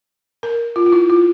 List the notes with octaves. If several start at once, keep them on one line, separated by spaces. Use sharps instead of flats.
A#4
F4
F4
E4
F4